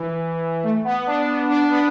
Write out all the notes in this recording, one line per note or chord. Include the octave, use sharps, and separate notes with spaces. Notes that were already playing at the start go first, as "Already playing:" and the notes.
Already playing: E3
A3
B3
D4
B3
D4
B3